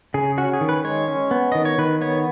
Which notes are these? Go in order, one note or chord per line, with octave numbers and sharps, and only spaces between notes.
C#3 G#4
C#4 F#4
G#4
D#3
B4
G#3 C#5
C#4
B3
D#3 D#5
C#5
D#3 B4
B3 C#5